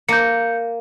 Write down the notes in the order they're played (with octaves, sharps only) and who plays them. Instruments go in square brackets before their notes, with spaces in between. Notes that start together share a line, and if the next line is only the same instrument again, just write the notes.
[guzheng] A#3 [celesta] G6 C#7